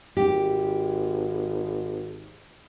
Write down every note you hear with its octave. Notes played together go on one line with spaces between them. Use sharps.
G#1 G4